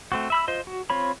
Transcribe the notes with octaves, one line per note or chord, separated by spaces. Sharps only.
A3 C4 F#4
E5 B5 E6
F4 C5 D#5
F#4
C4 F4 C#5 B5